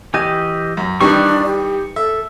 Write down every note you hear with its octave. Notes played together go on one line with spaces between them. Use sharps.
E3 G4 D#5 G#5
F#2
D#3 E3 G3 D4 C#6
G4
A4 E5